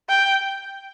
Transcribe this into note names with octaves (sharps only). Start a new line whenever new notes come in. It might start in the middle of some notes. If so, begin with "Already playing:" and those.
G5